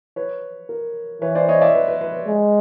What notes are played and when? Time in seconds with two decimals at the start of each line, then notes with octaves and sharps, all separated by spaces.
0.16 B4 C#5
0.69 A#4
1.22 E3 B4 C#5
1.35 C5 D5
1.49 C#5 D#5
1.61 D5 E5
1.75 B4
1.88 B4
2.01 B4
2.14 B4
2.28 G#3